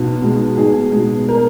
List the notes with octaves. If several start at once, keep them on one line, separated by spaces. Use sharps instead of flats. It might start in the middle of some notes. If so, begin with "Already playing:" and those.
Already playing: B1 B2
B2 G#3
B1 G#4
B2 G#3
A#4